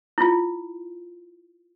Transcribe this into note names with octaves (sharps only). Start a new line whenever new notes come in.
E4 F4